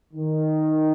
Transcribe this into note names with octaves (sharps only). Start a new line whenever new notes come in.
D#3